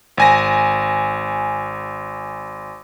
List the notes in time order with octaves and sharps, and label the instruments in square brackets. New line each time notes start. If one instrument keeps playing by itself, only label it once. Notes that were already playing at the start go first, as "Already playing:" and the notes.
[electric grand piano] G#1 G#5 A#6